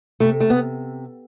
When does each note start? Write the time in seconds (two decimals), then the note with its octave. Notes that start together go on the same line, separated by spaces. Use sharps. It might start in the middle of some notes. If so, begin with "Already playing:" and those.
0.20 C3 A3
0.40 A3
0.50 B3